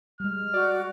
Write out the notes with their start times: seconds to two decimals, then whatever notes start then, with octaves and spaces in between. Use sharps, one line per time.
0.20 G3 G#3 F6
0.54 F#4 D5